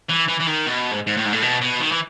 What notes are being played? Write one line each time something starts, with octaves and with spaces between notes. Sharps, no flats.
E3
E3
E3
D#3
B2
G#2
G#2
A2
G#2
A2
B2
B2
D#3
E3